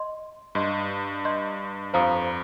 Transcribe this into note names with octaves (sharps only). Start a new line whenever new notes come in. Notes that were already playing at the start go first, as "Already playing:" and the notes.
Already playing: D#5 C6
G2 D#5 C6 G6
D#5 C6 G6
F2 C5 F5 A#5 D#6